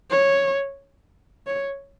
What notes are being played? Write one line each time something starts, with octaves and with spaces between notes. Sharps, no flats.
C#5
C#5